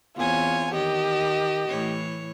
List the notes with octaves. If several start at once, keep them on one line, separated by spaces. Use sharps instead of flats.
E2 C4 F4 C#5 G#5
D#3 G4 D#5
A2 E3 C#5